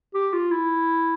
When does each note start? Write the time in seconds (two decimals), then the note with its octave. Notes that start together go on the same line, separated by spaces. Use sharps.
0.14 G4
0.33 F4
0.51 E4